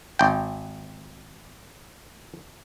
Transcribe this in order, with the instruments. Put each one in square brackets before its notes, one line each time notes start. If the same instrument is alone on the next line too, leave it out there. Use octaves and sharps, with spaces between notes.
[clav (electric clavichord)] G#1 G5